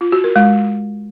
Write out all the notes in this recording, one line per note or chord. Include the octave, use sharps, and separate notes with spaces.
F4
F#4
A#4
G#3